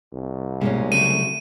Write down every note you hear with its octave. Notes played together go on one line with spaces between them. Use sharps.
C2
B2 G#3 A#3 C#4
C#3 F#3 A3 D#7